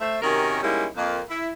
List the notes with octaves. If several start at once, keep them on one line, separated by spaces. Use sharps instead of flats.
A3 C5 E5
C3 D#3 C#4 F#4 G4 A#4
G3 G#3 A#3 C#4 D#4 E4
F2 A#3
E4